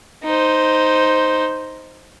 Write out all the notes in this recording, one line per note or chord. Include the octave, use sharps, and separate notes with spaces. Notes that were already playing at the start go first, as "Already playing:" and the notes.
D#4 C5